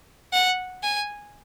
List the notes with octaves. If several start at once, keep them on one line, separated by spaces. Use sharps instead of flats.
F#5
G#5